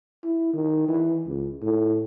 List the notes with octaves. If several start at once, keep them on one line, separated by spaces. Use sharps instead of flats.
E4
D#3
E3
C#2
A2